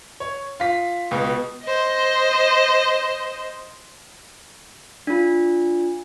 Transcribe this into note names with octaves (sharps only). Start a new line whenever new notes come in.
C#5
F4 B6
C#2 B2
C5 D#5
D4 F4